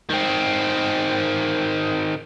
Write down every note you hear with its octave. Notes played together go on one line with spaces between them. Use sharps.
D#3 C4